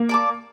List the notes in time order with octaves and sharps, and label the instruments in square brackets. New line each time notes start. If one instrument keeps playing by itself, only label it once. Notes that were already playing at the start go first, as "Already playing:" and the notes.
Already playing: [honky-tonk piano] A#3
[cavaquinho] D5 A5 D6